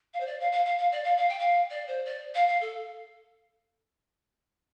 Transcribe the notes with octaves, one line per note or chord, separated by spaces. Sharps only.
F5
C5
D5
F5
F5
F5
F5
D5
F5
F5
G5
F5
D5
C5
D5
F5
F5
A4